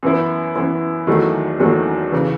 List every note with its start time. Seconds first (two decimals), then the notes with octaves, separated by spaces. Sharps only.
0.03 F#2 E3 B3 E4
0.56 F#2 E3 B3 E4
1.07 E2 D#3 F#3 A3
1.59 E2 D#3 F#3 A3
2.12 C#3 E3